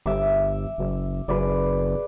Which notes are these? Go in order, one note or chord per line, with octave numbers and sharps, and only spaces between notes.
G1 E5 D6
F#1
F#1 G#4 B4 D5